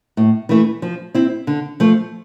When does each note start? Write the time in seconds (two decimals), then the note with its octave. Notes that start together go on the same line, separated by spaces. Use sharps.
0.17 A2
0.49 E3 A3 E4
0.82 F3
1.14 C4 E4
1.47 D3
1.80 F3 A3